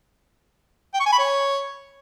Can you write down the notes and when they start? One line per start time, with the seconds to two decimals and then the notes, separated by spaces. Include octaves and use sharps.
0.94 G5
1.00 C#6
1.06 G#5
1.13 B5
1.19 C#5